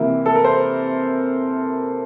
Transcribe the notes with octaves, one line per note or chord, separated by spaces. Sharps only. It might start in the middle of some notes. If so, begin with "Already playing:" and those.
Already playing: C3 E3 A#3 E4
A4
A#4
C5